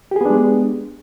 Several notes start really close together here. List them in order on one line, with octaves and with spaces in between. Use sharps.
G4 G#4 B3 D4 G#3